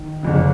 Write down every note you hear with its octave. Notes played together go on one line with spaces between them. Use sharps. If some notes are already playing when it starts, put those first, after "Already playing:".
Already playing: D#3
F#1 F2 D3